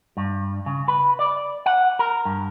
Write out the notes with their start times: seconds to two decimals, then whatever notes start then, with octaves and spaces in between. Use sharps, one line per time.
0.17 G2
0.66 C#3
0.88 B4
1.19 D5
1.66 F#5
1.99 A#4
2.25 G2